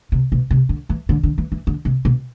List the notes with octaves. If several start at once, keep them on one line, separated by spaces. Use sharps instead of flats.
C3
B2
C3
D3
E3
D3
D3
E3
E3
D3
C3
B2